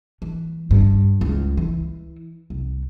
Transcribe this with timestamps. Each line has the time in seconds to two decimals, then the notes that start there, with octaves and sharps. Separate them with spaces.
0.22 E3
0.71 G2
1.21 C#2
1.57 E3
2.50 C2